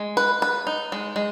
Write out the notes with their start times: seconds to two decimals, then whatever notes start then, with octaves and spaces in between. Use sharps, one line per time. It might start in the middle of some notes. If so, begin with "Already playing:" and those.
Already playing: G#3
0.17 B4
0.42 B4
0.67 D#4
0.92 G#3
1.16 G#3